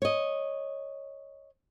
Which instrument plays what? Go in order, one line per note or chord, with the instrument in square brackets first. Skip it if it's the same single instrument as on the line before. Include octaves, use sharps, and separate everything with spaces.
[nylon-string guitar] C#5 D#5